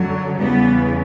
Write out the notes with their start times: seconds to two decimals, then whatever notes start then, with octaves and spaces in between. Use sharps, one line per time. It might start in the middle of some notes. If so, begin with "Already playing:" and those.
Already playing: F#2 D3 F#3
0.39 E2 C#3 E3 G3 B3